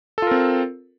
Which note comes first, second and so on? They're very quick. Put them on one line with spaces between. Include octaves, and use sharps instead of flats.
A4 F4 A#4 C4